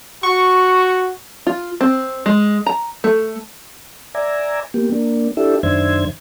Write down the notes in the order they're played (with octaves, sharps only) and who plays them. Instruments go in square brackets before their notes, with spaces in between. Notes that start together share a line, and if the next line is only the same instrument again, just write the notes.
[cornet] F#4 [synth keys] C#6
[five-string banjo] F4
C4
G#3
A#5
A3
[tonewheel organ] D5 E5 G#5 A#5
A#3 B3 G4
A#3 D4
D4 E4 G4 A4 E5
F#2 D#3 D4 C5 E5 G#6